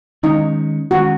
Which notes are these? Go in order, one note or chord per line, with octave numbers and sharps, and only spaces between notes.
D#3 G#3 C#4 D#4
D#3 G#3 C#4 F#4